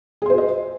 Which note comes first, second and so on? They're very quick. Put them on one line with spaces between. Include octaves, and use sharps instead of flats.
G#4 C6 C5 F#4 D#5